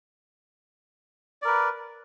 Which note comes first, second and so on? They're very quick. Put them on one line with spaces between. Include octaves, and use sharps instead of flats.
D5 A#4 B4